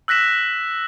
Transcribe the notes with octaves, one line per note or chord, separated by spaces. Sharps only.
E6 F#6 A#6 B6 E7